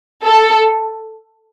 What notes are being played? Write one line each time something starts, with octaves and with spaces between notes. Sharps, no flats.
A4